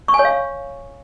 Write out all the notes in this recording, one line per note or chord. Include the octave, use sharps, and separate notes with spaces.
C#6
G#5
C#5
F5